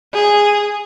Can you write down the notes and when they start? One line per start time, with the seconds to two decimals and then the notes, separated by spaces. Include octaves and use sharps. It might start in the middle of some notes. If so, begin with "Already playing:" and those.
0.13 G#4